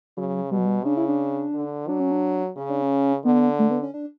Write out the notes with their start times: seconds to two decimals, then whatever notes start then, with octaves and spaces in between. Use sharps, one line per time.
0.17 C#3 F#3
0.51 B2 G3
0.58 F#3
0.66 G3
0.85 C#3 D4
0.97 E4
1.08 D4
1.55 D3
1.88 F#3 D4
2.00 C#4
2.11 D4
2.57 C#3 C#4
2.70 D4
2.82 C#4
3.25 D3 B3
3.59 A3
3.71 B3
3.83 C#4
3.94 D4